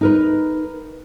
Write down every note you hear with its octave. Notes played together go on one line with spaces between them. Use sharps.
D#4 A#4 B4